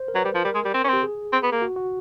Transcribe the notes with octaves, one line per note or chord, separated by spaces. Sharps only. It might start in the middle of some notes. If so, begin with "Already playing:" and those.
Already playing: C5
A#4
F#3 B4
G3
F3
G3 A#4
G#3
G3
C4
C#4
C4 G4
G#4
C4
B3
A#3
F#4
F#4